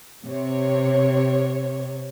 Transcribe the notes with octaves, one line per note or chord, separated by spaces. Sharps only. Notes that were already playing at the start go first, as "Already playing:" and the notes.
C3 C#5